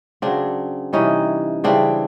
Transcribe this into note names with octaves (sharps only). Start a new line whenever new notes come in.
C#3 F#3 C4 D4
C3 E3 G3 C#4 D#4
C#3 E3 G3 C4 D4